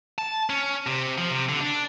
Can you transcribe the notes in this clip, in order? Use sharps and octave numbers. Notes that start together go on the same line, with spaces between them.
A5
C#4
C3
F3
C3
D3
D4